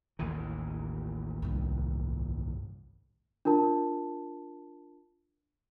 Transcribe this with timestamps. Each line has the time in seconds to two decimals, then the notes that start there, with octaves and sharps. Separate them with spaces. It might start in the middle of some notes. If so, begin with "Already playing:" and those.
0.19 A1 D#2 E3
1.42 C2 G2
3.45 D4 F4 A#4 A5